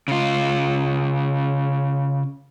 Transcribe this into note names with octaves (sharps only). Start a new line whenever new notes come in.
C#3 F4